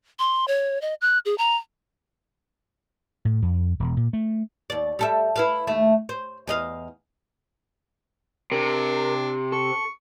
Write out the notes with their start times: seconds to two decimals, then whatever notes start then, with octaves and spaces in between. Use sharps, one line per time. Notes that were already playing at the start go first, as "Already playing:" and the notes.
0.19 C6
0.48 C#5
0.82 D#5
1.01 F#6
1.25 G#4
1.38 A#5
3.25 A2
3.42 F2
3.80 E1
3.97 A#2
4.13 A3
4.70 D#2 D5
4.99 G3 A4 E5
5.36 E4 B4 F5
5.67 D#2 A3 E5
6.09 C5
6.47 E2 D#5 F5
8.52 C3 D4 A#4
9.52 A4 C#6